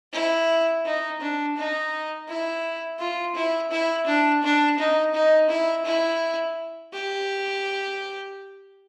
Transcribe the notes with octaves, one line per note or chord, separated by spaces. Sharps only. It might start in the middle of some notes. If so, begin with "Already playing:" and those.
E4
D#4
D4
D#4
E4
F4
E4
E4
D4
D4
D#4
D#4
E4
E4
G4